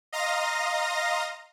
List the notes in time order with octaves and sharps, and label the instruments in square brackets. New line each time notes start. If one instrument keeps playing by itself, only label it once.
[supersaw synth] D#5 F5 A#5 C6 D#6 A#6